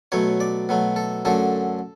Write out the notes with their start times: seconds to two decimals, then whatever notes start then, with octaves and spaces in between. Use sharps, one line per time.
0.12 B2 F#3 A3 C#5
0.40 D5
0.69 B2 F#3 A3
0.96 A4
1.25 F#2 D3 A3 A4